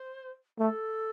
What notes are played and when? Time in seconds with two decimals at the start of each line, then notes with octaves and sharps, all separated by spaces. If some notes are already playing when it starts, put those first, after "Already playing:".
Already playing: C5
0.59 A3 A4